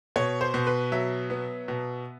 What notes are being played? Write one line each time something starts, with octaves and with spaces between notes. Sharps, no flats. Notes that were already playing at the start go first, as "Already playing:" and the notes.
B2 C#5
C5
B2
B4
F#3 E5
B3
B2